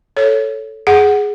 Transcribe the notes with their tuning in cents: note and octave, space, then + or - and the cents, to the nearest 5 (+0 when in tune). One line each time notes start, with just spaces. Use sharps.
A4 +0 C#5 +0
G#4 +0 F#5 +5